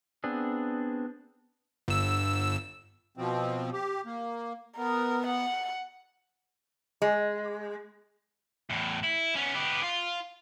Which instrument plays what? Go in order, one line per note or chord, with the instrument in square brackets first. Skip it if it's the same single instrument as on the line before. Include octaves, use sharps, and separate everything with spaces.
[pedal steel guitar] B3 C4 D4 G#4
[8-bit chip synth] G1 E6
[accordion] B2 F3 C4
G4
A#3
[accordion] B3 [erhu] A#4
[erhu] F#5
[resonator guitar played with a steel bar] G#3
[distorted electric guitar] E2 A2
E4
B3 C#4
B3 G4
F4